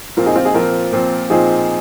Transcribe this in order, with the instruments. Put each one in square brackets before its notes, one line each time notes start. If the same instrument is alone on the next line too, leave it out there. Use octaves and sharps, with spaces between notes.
[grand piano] A#2 F3 C4 [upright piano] F4 A#4
[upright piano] D#4 G#4
C4 F4
D#4 G#4
[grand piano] A#2 F3 C4 [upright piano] F4 A#4
[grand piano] A#2 F3 C4
[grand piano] A#2 F3 C4 [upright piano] D#4 G#4